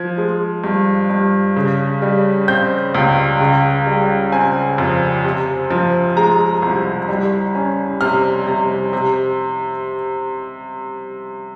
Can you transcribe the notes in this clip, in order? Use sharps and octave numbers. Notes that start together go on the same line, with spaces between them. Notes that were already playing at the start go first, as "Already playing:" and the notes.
Already playing: F3 G#6
G#3
G2
G2
C#3
G3
C4 G6
C#2
C#3
G3
C4 G#5
F2
C3
F3
G#3 A#5
C2
G3
C#4
C3 F6
C3
C3